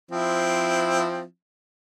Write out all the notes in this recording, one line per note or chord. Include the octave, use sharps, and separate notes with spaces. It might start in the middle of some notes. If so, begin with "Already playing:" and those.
F3 C4 E4